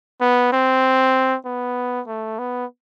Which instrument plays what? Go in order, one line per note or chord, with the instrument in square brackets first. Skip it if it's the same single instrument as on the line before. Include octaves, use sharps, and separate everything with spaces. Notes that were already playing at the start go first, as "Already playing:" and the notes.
[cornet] B3
C4
B3
A3
B3